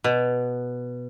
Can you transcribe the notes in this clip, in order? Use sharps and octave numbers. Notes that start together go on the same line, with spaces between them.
B2